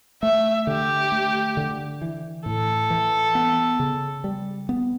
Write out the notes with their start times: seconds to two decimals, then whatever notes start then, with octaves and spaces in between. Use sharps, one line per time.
0.23 A3 E5
0.67 D3 G4
1.12 A3
1.57 D3
2.02 E3
2.46 A2 A4
2.90 E3
3.35 B3
3.80 C#3
4.24 G3
4.69 B3